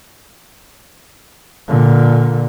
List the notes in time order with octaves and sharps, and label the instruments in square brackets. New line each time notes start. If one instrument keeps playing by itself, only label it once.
[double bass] A#2 D3